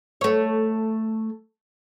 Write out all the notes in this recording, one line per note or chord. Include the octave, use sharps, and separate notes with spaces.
A3 C#5